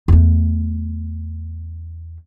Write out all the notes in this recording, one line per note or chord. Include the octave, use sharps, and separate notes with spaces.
E2 A3